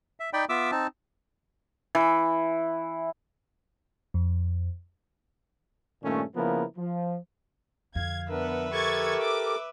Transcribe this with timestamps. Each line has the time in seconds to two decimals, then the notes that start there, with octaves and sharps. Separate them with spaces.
0.20 E5
0.33 D#4 D5 G5 B5
0.49 B3 F4 E5 D6 E6
0.72 C4 D#4 A5
1.95 E3
4.14 F2
6.03 G2 A#2 D#3 A3 C#4
6.35 C#3 F3 A#3 B3 E4 A#4
6.77 F3
7.95 F2 D3 F5 G#6
8.30 B3 D4 A#4 B4 E5
8.73 G4 A4 A#4 C#6 G#6 A6
9.22 D6